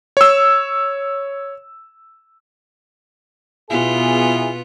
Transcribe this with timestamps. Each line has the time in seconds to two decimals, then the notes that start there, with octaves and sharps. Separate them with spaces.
0.17 C#5 E6
3.70 B2 B3 E4 F4 G#4